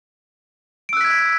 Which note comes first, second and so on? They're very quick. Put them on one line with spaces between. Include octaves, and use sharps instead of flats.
D7 E6 F#6 B6 G#6